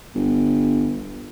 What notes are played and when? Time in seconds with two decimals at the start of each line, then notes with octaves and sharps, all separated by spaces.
0.15 G1